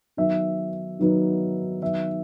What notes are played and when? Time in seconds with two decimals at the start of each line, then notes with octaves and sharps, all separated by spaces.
0.17 D#3 F#3 B3 D#4 E5
0.99 D#3 F#3 B3 D#4
1.82 D#3 F#3 B3 E5